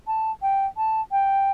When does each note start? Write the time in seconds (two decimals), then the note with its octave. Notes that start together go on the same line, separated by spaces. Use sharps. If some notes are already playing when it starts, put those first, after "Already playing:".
0.07 A5
0.42 G5
0.77 A5
1.11 G5